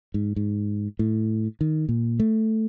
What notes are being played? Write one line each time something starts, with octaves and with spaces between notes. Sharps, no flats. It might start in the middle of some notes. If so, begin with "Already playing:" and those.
G#2
G#2
A2
D#3
A#2
A3